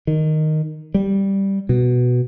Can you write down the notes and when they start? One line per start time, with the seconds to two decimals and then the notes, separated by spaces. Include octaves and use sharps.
0.07 D#3
0.94 G3
1.69 B2